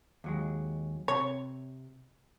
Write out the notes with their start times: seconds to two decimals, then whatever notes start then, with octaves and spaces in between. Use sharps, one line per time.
0.24 D#2 F#3 G#3
1.08 C3 C#5